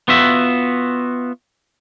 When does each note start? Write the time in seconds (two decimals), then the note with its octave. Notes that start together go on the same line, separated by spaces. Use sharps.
0.08 B3 F4 F#4 E5